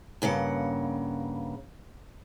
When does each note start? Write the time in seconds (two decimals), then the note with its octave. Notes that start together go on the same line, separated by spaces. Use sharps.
0.22 G2 C#3 A#3 F#5